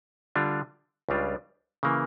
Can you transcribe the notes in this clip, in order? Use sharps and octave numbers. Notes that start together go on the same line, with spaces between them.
D3 G3 D4 F4
C#2 C#3 G3 D4 F4
C#3 E3 A#3